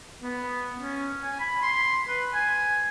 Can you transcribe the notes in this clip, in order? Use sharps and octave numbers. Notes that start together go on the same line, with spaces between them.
B3
C#4
G#5
B5
C6
B4
G#5